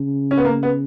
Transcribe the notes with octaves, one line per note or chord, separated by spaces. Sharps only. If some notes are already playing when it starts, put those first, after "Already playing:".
Already playing: C#3
C#4
B3
A#3
B3